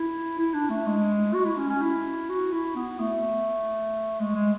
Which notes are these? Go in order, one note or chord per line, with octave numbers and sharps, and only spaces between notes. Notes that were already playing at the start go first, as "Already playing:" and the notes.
Already playing: E4
E4
D4
A3
G#3
F#4
E4
C#4
C#4
E4
F#4
E4
B3
A3
G#3
G#3